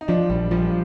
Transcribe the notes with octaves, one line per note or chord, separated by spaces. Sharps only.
D#4
F3 D4
A#1 G3
F3 G3